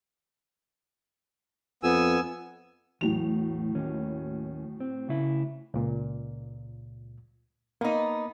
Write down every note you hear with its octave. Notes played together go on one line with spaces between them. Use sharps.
F2 B3 G#5 E6
E2 A2 F#3 F7
D#2 C#4
C4
C#3 E4
C#2 A#2
A#3 B3 D#4